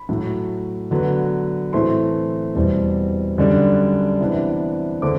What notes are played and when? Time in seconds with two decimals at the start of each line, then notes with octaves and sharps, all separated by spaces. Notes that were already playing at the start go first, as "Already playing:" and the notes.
Already playing: B5
0.09 A2 F#3 A3
0.91 D3 F#3 B3
1.73 A2 E3 A3 C4 C6
2.55 E2 B2 G3 C4
3.38 F#2 D3 G3 D4
4.20 C3 E3 B3 D4
5.02 D3 A3 C4 D6